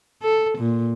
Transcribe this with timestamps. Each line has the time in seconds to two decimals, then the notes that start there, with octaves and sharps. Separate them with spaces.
0.22 A4
0.59 A#2